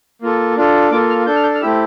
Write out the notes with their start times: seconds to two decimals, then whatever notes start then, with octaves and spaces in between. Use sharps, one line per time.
0.22 A#3 F4 A4
0.57 D4 F4 A4
0.91 A#3 F4 A4 D6
1.09 F6
1.26 D4 A4 G6
1.35 F6
1.43 G6
1.55 F6
1.61 A3 C4 E4 G4 E6